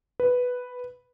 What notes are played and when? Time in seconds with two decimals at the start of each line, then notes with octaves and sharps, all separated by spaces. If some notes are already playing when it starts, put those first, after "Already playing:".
0.20 B4